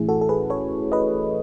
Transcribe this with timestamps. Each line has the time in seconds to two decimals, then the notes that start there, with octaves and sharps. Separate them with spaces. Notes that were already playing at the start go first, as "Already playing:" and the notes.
Already playing: A2 E3 A3 C#4 E4 G#4
0.09 F#4 A4
0.21 A4
0.29 G#4 B4
0.50 A4 C#5
0.92 B4 D#5